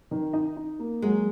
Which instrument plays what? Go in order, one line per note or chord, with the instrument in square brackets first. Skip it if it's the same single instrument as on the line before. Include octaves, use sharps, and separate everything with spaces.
[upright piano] D#3
D#4
D#4
A#3
[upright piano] F#3 [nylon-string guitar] G#3